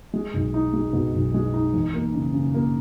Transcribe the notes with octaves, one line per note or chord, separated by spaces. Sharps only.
G#3
B1
D#4
G#3
B2
B1
G#3
D#4
E2
A#3
C#3
C#3
A#3